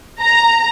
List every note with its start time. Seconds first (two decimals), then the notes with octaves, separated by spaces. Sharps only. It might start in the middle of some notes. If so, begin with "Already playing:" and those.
0.20 A#5